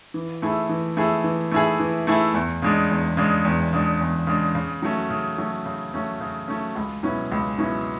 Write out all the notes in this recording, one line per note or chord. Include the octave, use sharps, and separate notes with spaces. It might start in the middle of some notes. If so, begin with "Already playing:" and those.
E3
A3 E4 G#4
E3
A3 E4 G#4
E3
A3 E4 G#4
E3
A3 E4 G#4
E2
C#3 G#3 D4
E2
C#3 G#3 D4
E2
C#3 G#3 D4
E2
C#3 G#3 D4
C#3
F#3 A3 C#4
C#3
F#3 A3 C#4
C#3
F#3 A3 C#4
C#3
F#3 A3 C#4
C#2
B2 F#3 C#4 E4
C#2
B2 F#3 C#4 E4